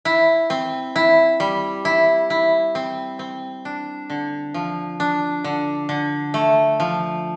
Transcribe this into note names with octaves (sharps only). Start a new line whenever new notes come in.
E4
C4
E4
G3
E4
E4
C4
C4
D4
D3
F3
D4
D3
D3
A3
F3